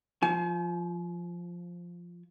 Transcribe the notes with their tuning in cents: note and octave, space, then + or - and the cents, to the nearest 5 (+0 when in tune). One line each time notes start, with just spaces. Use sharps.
F3 +0 G#5 +45